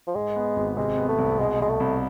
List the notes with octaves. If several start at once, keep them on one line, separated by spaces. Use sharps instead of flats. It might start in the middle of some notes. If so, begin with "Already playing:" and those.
F3
G#2 G#3
B3
G#1
C3 G#3
B3
A3
C2
B2 G#3
C2 G#3
A3
C2